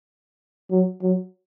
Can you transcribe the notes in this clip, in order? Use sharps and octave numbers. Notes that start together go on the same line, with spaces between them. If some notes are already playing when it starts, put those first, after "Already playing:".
F#3
F#3